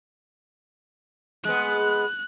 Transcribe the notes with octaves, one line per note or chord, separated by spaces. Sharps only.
G#3 B3 F#6